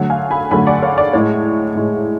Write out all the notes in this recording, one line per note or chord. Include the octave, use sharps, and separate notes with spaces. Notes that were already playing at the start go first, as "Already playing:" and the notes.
Already playing: D3 F#3 A3
F5 G#5
G#5 B5
D3 F#3 A3 G#5 B5
D5 F#5
C#5 F5
D5
A2 G#3 C#5
A2 G#3